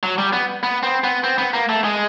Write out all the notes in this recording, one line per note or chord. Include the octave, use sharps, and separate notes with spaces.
F#3
G3
B3
B3
C4
B3
C4
B3
A#3
A3
G#3